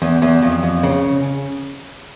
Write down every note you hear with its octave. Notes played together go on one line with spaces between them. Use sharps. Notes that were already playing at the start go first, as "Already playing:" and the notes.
E2
E2
F2
F2
C#3